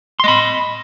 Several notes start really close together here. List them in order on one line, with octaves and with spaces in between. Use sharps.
C6 D#5 B5